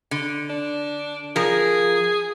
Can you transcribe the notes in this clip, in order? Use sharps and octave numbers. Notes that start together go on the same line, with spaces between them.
D3
D4
F3 G#4 A#4